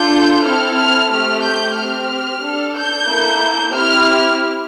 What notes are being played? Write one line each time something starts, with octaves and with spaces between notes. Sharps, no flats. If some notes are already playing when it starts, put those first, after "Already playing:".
Already playing: D4 F4 A4 G6
C4 E4 A4 F6
F6
A3 C4 G4 F6
G6
C4 G4 F6
D4 A4
G6
A#3 E4 A4
C4 E4 G4 F6